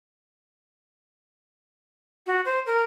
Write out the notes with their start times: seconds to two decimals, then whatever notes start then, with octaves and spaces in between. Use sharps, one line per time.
2.27 F#4
2.45 C5
2.66 A#4